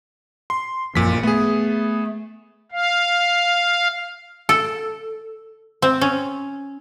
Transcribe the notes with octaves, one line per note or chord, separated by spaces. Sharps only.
C6
A1 F#2 A#2 F3 B6
A3 B3 G#4
F5
A4
C4
C#4